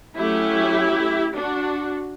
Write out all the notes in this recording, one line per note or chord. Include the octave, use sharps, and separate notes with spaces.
F#3 A3 C#4 E4 G4
D4 F#4